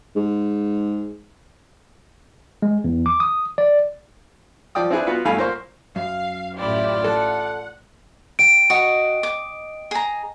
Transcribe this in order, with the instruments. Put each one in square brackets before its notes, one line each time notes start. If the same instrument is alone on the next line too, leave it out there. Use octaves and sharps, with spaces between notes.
[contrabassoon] G#2
[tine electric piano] G#3
E2
D6
D#6
D5
[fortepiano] F3 D5 G5 D#6
C4 D4 E4 G#4 B4
B3 F4 F#4 B4
G2 B2 A3 F5 G#5 B5
A#2 A#3 C5 C#6
[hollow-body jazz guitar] F#2 [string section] F5
[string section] A1 E4 G4 [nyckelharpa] F4 D5
[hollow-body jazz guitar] A4 A5 [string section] F#5
[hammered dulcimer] G5 [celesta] D7
[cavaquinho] F#4 [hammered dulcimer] D#5
[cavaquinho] D6
G#4 A#5